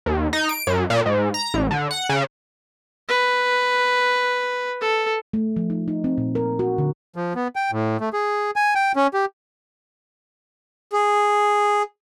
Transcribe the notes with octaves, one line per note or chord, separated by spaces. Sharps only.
D#2
D#4
D7
F#2
A#2
G#2
A#5
A1
D3
F#5
C#3
B4
A4
A3
F3
D#4
D#4
C4
A#2
A#4
F#4
D3
F3
B3
G5
A2
A3
G#4
G#5
G5
C#4
G4
G#4